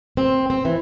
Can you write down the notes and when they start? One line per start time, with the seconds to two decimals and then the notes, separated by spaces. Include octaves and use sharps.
0.17 C4
0.50 C4
0.65 E3